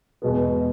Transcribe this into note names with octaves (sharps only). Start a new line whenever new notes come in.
E2 B2 G#3 B3